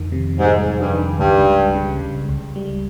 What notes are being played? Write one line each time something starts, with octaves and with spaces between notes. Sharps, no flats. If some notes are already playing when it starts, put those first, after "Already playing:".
Already playing: F2 D#3
C3
G#2 G3
F2
G2
D#3
C#2 G2
G3
C#3
C#2
C#2
G3